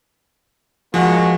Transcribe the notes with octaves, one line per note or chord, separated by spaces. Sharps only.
F3 G#3 A#3 F#4